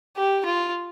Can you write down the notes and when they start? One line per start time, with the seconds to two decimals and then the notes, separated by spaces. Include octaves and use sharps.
0.16 G4
0.45 F4